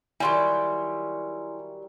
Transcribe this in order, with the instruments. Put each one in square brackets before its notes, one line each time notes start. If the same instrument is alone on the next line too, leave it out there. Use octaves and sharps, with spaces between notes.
[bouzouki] D#3 F#3 G3 [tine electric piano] E4 [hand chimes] G#5 C6